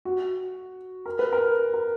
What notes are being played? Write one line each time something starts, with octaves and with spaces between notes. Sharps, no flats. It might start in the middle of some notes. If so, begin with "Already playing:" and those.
F#4
A#4
B4
A#4
A#4